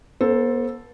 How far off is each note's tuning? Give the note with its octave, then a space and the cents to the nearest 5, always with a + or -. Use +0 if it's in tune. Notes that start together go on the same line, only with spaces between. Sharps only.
B3 -45 A4 +0 C5 +15